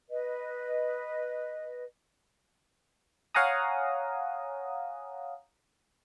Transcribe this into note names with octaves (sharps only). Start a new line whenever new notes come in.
B4 D#5
C#5 F5 F#5 G#5 A#5 D#6